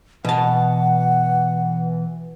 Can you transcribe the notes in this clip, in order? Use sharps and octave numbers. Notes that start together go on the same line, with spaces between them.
B2 E3 F#5 A5